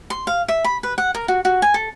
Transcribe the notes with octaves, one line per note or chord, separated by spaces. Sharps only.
C6
F5
E5
B5
B4
F#5
A#4
F#4
F#4
G#5
A4